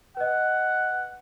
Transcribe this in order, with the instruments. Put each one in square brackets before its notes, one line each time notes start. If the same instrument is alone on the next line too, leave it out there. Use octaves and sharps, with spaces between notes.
[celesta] B4 D#5 [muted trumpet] F#5